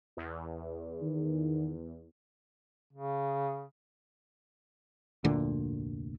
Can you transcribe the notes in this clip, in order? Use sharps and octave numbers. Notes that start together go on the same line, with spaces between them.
E2
D#3
C#3
F1 D2 A#2 D3